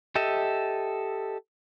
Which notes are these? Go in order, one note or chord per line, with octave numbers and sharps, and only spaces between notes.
G4 A4 D#5 E5